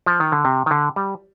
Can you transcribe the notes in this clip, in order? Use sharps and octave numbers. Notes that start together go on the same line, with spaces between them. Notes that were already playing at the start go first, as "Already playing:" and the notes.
F3
D#3
D3
C3
D#3
D3
G3